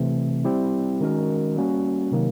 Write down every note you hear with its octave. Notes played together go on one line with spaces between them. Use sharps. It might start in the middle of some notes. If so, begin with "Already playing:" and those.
Already playing: C3 E3 A3 C4
G3 C4 E4 G4
D#3 G#3 C#4 F#4 A#4
G3 A#3 C#4 F#4
C3 D#3 F#3 A#3